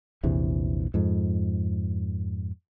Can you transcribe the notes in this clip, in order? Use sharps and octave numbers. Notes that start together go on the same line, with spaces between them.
A#1 E2 C3 E3
F2 G#2